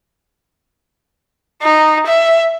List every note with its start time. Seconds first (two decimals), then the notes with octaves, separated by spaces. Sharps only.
1.62 D#4
2.07 E5